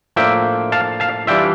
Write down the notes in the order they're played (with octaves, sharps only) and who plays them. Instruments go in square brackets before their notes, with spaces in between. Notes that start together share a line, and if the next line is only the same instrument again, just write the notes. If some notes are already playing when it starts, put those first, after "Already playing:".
[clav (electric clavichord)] A2 F3 A#3 D4 E5 G5
F5 A5
F5 A5
E3 G3 D4 F4 E5 G5